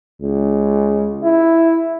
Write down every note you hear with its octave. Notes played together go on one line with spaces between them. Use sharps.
C#2
E4